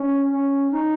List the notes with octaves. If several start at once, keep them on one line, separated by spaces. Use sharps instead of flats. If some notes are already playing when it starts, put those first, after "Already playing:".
Already playing: C#4
C#4
D#4